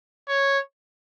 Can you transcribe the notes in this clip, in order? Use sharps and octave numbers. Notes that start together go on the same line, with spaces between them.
C#5